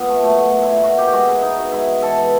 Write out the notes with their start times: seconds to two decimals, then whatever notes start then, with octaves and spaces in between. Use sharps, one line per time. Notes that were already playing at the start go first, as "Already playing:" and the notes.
Already playing: A#2 B3
0.09 A3
0.23 F#3 A3
0.38 A3
0.54 A#2
0.63 E4
0.68 A#2
0.83 B2 F#4
0.98 B2 G4
1.08 G4
1.13 G#3 F#4
1.28 G#3 E4
1.43 B2 D#4
1.58 B2
1.72 G#3 E4
1.87 G#3
2.02 E3 A4
2.17 E3